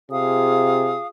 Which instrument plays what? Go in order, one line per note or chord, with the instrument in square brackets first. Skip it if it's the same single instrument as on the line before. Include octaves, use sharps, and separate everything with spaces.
[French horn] C3 [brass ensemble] F4 G#4 [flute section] F5 D#6